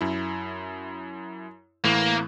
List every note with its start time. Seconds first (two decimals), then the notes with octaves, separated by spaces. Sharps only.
0.01 F#2 E4
1.84 A2 E3 A#3